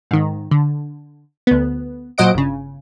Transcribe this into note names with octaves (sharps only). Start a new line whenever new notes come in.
G#2 D#3
D3
D2 B3
A#2 F#3 C5 D#5 F#5 D7
G1 C#3